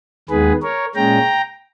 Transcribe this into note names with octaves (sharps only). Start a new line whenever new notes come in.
D#2 D#3 G#3 B3 G#4 B4
A#4 C#5
A#2 G#3 C#4 G5 A#5